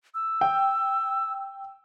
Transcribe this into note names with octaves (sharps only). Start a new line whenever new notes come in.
E6
G5